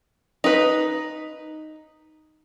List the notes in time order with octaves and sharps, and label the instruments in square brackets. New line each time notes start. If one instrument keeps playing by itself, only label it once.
[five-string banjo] D#4 B4